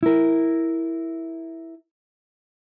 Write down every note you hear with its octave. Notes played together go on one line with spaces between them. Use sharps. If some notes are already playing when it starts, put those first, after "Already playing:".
E4 A#4